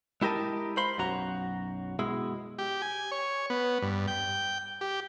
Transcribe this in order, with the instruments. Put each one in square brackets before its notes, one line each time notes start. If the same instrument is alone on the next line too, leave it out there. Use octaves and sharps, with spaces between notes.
[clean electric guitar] G#3 E4 G4 A#4 D#5 A5
C5 F5 B5 C6
B1 F#2 F#4 A#5
B2 G#3 E4
[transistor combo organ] G4
G#5
C#5
B3
G2
G5
G4